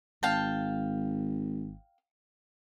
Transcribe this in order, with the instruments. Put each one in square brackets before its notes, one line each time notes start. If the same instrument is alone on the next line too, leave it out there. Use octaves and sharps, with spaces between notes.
[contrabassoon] G#1 [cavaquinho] F5 G5 A5